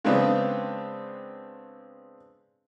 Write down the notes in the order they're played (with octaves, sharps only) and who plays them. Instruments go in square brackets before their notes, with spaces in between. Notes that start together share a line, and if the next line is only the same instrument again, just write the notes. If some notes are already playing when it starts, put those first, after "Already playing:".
[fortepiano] C#3 G#3 B3 C4 D4